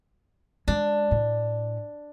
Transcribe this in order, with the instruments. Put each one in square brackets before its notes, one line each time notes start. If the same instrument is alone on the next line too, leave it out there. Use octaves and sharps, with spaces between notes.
[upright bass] G#3 [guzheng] D4
[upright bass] A2